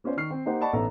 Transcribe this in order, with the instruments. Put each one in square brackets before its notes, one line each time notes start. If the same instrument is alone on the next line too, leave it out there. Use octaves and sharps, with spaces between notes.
[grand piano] B3 C#4 F4 C5 D5
D#3 C#6 F6 C7
C4
A#3 D#4 G4 C5 F#5
D5 D#5 F#5 A5 B5 C#6
A1 B3 D#4 A4 E5 A#5